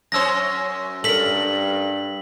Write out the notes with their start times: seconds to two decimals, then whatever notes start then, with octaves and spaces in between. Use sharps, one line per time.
0.12 F#2 C#4 C5 E6 A#6
1.04 G2 A4 A#4 B6 F#7